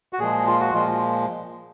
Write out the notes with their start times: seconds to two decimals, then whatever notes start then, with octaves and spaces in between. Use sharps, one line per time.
0.13 F#4
0.19 A#2 F3 G#3 G#4
0.47 F4
0.60 F#4
0.74 A#2 F3 G#3 F4